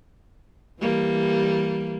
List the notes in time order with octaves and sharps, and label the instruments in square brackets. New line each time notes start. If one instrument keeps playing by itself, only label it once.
[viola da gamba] E3 G3 A#3